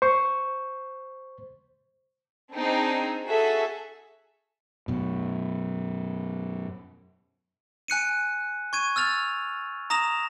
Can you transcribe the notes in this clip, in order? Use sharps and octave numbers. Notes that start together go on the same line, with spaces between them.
C5 C#6
C4 D4 D#4 G#4 C5
F#4 G#4 A4 E5
F#2 B2
G#5 F#6 C#7 D#7
C#6 G#6 D#7
E6 F6 A6 F7
A#5 D#6 A#6 E7 F7